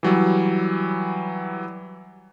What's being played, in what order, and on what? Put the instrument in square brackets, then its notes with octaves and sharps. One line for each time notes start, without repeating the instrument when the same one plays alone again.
[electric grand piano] E3 F#3 G3